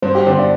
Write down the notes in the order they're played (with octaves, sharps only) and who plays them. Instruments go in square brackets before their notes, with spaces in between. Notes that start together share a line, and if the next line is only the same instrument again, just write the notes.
[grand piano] G2 [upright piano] C5
[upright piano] G4
[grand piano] D3 [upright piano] C5
[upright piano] D5